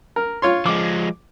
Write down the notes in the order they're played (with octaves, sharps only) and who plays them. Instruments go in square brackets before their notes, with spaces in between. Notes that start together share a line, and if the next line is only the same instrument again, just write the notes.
[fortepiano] A#4
F4 C#5 C6
[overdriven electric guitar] F3 G#3 [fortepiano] D6